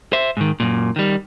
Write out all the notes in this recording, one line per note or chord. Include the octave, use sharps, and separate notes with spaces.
C5 E5
G#2 D#3
F#2 A#2
D#3 G3